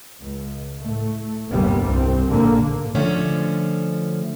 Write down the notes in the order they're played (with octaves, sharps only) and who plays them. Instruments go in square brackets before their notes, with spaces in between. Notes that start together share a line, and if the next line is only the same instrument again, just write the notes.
[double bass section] C#2
A2 A3
G1 D#2 C3 G3 B3
C2 C4
A#1 G#2 D3 A#3
[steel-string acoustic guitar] D3 F3 A3 C#4